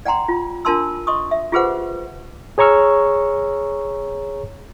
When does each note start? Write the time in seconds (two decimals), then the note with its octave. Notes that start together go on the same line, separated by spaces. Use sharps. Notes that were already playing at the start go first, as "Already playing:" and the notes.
0.05 D5 F#5 G5 A#5 C6
0.28 F4
0.65 D4 F4 A#4 A5 C6 E6
1.07 D#5 C6 C#6 D#6
1.31 E5
1.52 F4 G4 G#4 B4 C5 F#5
2.58 G#4 C#5 A#5 C#6 E6 F6